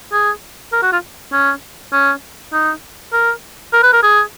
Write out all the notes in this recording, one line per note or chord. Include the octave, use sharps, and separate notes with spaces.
G#4
A#4
F#4
F4
C#4
C#4
D#4
A#4
A#4
B4
A#4
G#4